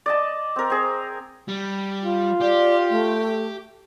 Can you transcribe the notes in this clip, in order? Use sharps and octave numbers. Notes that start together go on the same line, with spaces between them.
D5 D#5 A5
C4 A#4
C4 G#4
G3
F4
G4 D5
A3